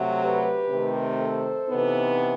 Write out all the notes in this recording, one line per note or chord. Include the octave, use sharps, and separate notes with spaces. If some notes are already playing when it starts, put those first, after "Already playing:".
Already playing: C3 F#3 A3
G4 B4
C3 D#3 A3 C4
A4 C5
C3 E3 B3 D#4